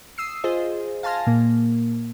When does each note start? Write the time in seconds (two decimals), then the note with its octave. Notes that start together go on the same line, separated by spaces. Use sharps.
0.18 D#6 E6 C7
0.44 F4 G#4 C5 D#5
1.03 F5 G#5 A5 C6 F6 A#6
1.27 A#2 A#3